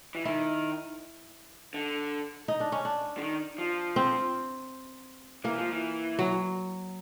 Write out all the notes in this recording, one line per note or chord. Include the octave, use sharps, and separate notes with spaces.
E3
D#3 E4
D3
D#4
D4
C#4
D4
D3
D#3
F3
C4
E3 A#3
F3
E3
F#3